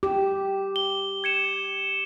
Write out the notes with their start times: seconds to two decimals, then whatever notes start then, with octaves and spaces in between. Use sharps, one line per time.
0.03 G4 D6
0.76 G7
1.24 G#6 C#7 E7